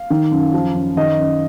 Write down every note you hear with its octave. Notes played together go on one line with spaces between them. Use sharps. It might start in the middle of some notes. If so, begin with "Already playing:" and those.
Already playing: F5
D#3
F#2
F3
F#2
D#3 D#5
F#2